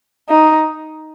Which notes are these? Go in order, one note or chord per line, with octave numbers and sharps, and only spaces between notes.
D#4